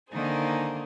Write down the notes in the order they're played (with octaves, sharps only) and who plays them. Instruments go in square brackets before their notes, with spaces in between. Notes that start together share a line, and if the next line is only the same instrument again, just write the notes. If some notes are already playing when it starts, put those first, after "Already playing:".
[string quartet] D3 D#3 A#3 D#4 G#4 C5